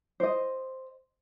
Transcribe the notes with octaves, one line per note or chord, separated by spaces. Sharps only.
C5 D#5